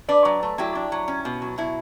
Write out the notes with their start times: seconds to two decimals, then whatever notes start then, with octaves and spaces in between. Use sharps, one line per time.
0.09 D4 B4 D5
0.25 F#3
0.43 A3
0.58 F#3 E4 G4
0.75 D4
0.92 F#3
1.08 C#4
1.25 B2
1.42 F#3
1.58 B2 E4